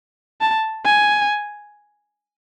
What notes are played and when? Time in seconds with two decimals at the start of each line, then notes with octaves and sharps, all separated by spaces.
0.41 A5
0.86 G#5